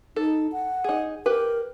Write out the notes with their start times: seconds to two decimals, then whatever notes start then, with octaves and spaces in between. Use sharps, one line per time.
0.16 D#4 A4
0.52 F#5
0.84 D#4 G#4
1.26 G4 A#4 B4